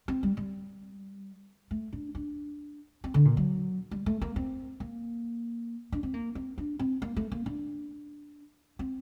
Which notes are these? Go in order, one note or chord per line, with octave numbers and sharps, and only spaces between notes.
C4
G3
G3
A3
D4
D4
C4
D3
A#2
F#3
G3
A3
A#3
C4
A#3
D4
C4
A#3
C4
D4
C4
A#3
A3
A#3
D4
C4